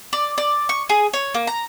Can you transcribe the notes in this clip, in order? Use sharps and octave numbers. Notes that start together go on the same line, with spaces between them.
D5
D5
C#6
G#4
C#5
A#3
A#5